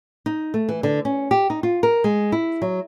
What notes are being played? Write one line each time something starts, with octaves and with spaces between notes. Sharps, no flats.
D#4
A3
E3
D3
C#4
G4
D#4
F4
A#4
G#3
E4
F#3